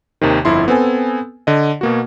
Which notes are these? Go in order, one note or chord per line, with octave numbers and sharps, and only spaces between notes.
D#2 C3 D#3
G1 F2 E4 C6
B3 C4 A4 G#5
D3 D#5
B2 A#3 F#4